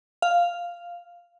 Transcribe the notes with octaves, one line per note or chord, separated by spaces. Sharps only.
F5